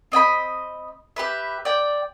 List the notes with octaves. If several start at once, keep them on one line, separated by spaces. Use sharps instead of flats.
C4 D#5 G5 B5
G4 B4 E5
D5 G5